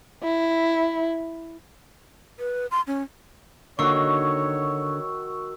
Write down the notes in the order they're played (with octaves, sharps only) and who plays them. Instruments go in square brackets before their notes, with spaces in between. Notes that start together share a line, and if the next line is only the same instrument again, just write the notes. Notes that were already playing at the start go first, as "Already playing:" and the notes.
[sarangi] E4
[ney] B4
C6
C#4
[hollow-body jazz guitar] D3 A#3 [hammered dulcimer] D#3 F#4 [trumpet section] C#5 [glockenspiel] C#6 E6